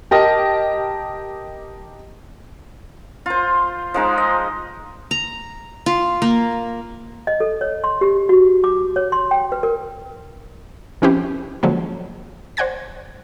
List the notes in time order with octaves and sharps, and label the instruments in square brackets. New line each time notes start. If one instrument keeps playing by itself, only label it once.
[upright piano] G4 A#4 D#5 A5
[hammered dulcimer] F4 C5
F3 G#3 D#4
D#5
[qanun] A#5
F4
A#3
[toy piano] D#5
A4
C#5
C6
G4
F#4
D6
C#5
C6
G5
B4
A#4
[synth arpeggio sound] F3 C4 C#4 E4 G4 B4
D3 F3 F#3 G#3 A#3 C#4
C5 D5 F#5 G#5 G#6 A#6